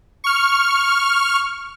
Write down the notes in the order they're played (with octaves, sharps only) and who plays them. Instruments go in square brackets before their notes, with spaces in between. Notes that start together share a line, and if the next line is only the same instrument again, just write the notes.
[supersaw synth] C#6 F6